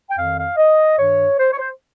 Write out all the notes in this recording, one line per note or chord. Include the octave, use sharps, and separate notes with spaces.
G5
F2 D#3 F5
F5
D#5
G2 D#3 C#5
C5
C#5
C5